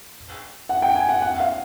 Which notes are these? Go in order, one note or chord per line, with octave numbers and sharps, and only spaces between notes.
F#5
G5
G#5
F#5
F#5
F5